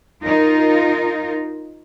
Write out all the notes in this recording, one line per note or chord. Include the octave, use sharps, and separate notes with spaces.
D#4 F4 A#4